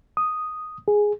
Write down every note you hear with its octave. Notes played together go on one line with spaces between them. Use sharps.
D#6
G#4